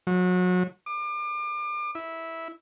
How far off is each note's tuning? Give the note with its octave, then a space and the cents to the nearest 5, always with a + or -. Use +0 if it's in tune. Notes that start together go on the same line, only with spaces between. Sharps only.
F#3 -30
D6 +35
E4 -10